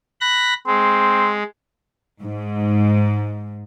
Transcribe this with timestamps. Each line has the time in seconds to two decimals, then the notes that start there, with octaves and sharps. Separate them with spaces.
0.21 B5 F#6 A#6
0.67 G#3 C4
2.22 G#2